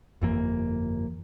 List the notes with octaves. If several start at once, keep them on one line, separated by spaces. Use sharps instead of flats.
G1 F2 E3 A#3